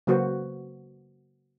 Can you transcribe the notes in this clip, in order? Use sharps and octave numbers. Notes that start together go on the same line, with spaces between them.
C#3 F#3 A#3 F#4 B4 C5